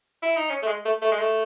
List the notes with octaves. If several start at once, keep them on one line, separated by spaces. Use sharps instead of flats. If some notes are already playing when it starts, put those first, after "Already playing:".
E4
D#4
C#4
A3
G#3
A3
A3
G#3
A3